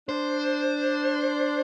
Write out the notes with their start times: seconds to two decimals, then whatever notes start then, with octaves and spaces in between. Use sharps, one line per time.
0.08 D4 C5